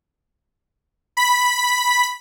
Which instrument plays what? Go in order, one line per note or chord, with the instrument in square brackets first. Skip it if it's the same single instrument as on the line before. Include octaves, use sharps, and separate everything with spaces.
[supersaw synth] B5 B6